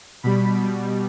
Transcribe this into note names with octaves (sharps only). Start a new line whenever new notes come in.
B2 G3 B5
B2 G3